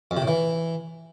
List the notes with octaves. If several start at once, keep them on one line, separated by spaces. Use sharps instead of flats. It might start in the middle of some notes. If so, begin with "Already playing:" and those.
F2
C3
A2
E3